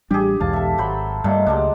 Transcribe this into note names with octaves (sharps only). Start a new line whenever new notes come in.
A1 G3 D4 G4 G#4
B1 E2 G#2 F5 A5
A4 E5
G#1 F#3 C5 B5
G2 A#2 D#3 G3 A3
C#2 F#3 G#3 D4